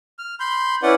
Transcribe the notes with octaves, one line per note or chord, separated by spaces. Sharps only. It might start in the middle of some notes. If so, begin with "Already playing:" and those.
F6
B5 C6 G6
C#4 E4 B4 D5 F#5